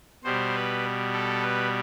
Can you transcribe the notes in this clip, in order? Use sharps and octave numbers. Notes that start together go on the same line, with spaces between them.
B2 G3 C5
B4
A4
B4